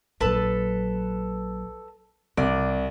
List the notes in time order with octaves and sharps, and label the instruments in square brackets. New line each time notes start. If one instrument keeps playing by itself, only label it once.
[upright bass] A#1 F#3 [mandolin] A4 B4 A5
[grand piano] C2 [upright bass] C3 E3 [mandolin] D5